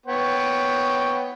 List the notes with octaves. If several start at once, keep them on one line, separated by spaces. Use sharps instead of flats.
B3 C#5 G5